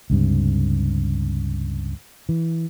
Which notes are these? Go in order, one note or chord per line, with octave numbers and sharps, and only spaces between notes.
C#2 G2 C3
E3